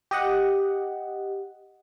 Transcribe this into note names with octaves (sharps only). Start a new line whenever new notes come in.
G4 D#5 F#5